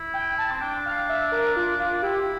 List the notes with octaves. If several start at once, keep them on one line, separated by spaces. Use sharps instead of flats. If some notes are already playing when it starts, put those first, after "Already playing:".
Already playing: E4
G5
A5
C4
D4 G5
F5
E5
A#4
F4
F4
E4 G4